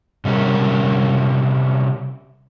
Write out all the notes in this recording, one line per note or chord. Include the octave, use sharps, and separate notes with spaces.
C3 G3 C#4 G4 G#4 A#4